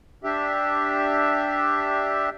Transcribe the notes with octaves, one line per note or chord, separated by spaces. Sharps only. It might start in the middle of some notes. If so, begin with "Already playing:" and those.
D4 G4 E5